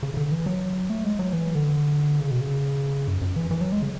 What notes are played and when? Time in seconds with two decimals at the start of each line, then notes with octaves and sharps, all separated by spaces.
0.03 C#3
0.14 C#3
0.17 D3
0.32 E3
0.46 F#3
0.90 A3
1.04 G#3
1.19 F#3
1.33 E3
1.55 D3
2.20 C#3
2.31 B2
2.41 C#3
3.08 F#2
3.22 F#2
3.36 E3
3.51 E3
3.61 F#3
3.72 G#3
3.83 C#3